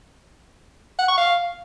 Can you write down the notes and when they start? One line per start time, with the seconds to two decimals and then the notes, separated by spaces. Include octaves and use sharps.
0.99 F#5
1.08 C#6
1.17 F5